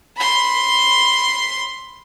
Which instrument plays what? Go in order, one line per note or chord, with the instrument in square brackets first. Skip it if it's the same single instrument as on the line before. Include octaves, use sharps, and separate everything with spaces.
[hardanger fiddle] B5 C6